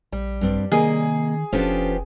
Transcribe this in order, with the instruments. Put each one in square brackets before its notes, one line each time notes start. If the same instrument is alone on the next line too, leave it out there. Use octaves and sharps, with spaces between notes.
[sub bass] A#1 [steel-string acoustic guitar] G3
[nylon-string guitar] G2 C4 D4
[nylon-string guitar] C3 A#3 D#5 [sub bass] D#3 [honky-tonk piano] G#4
[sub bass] F1 [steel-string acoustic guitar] F3 B3 G4 [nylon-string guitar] C#4 D4 A4